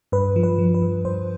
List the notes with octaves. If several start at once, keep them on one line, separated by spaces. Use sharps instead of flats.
G2 B4
F3
B4
F3
B4
G2
G2 C5